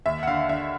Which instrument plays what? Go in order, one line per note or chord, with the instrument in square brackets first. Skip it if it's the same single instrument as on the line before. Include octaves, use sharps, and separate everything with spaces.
[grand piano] D#2 E5
F#5
D3 F5
D3 E5